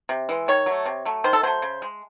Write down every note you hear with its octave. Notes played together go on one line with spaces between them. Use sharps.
C3
E3 G#3
D#3 C#5
F#3 A3
C3
F#3 A3
D#3 C5
A4
F#3 A3 C5
C#3
G#3